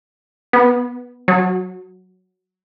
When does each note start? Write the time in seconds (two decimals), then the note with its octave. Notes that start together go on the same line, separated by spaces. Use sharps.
0.53 B3
1.28 F#3